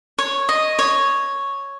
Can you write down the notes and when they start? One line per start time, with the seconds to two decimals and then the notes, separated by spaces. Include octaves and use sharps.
0.18 C#5
0.49 D#5
0.79 C#5